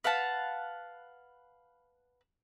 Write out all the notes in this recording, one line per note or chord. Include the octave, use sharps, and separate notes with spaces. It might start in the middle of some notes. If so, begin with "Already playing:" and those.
B4 F5 F#5 A5